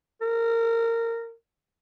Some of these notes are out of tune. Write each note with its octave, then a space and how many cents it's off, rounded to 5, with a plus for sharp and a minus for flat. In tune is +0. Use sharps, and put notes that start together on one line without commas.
A#4 -20